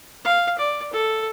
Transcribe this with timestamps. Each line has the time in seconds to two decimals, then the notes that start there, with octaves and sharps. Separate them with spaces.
0.25 F5
0.58 D5
0.93 A4